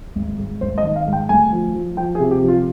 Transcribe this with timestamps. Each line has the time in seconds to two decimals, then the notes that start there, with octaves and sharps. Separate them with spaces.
0.16 G#1
0.38 G#2
0.61 G#1 C5
0.78 D#5
0.84 D#3
0.96 F5
1.07 G#2
1.13 G5
1.29 D2 G#5
1.53 F3
1.75 F3
1.97 F3 G5
2.15 G#4
2.20 C3
2.31 G4
2.43 F3
2.48 F4